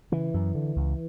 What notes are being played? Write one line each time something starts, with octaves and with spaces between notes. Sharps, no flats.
C#3 E3
F#2
D3
C#2